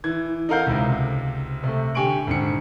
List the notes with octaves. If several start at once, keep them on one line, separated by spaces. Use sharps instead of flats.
E3 G#6
D#4 A4 A#4 F5 F#5 G6
C#2 C3
C3 A3
D3 G4 G#5 C#6 D7 F#7
G#1 D3 C#7